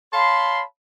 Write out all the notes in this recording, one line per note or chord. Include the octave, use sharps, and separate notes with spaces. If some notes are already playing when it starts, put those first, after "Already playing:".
C#5 F5 A5 B5 C6